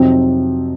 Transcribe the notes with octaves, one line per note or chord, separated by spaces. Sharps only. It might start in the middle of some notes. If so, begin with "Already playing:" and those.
Already playing: F2 C3 F#3 C4 D#4